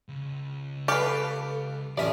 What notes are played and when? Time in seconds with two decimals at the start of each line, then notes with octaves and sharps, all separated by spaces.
0.09 C#2
0.88 G4 A4 B4 F5
1.97 A1 F2 C#4 G4 C5 D5 E5